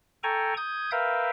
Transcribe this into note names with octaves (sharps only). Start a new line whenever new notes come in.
A4 G5 G#5 A#5 C#6
D#6 G6 G#6
A#4 B4 E5 F5 G5